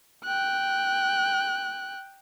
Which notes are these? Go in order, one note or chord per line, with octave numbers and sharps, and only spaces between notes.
G5 F#6